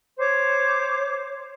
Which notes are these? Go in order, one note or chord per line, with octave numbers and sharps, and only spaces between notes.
C5 C#5 D6